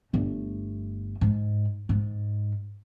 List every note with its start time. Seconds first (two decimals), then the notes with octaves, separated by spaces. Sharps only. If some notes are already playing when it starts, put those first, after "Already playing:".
0.13 G1 A3
1.21 G#2
1.89 G#2